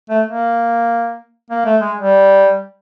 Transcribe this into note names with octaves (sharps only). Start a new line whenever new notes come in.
A3
A#3
A#3
A3
G#3
G3